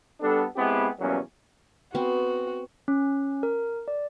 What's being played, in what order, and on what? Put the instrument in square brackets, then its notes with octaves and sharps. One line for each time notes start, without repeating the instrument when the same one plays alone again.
[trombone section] G3 B3 D4 A4
G#3 B3 C4 E4 G4 G#4
E2 B2 F#3 G3 A#3 C#4
[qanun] B3 C4 [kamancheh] F#4
[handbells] C#4
A#4
D5